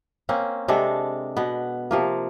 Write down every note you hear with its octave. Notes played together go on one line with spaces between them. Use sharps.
A#3 C4 C#4
C3 G#3 D4 A4
B2 B3
C3 F3 A#3